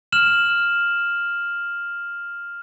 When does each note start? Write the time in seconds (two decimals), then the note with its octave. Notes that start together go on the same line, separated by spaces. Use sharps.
0.12 F6 E7 F#7